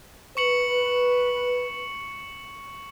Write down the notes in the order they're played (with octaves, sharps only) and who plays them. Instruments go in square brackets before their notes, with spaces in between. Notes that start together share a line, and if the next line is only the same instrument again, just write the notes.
[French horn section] B4 [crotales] C#6 C#7 F#7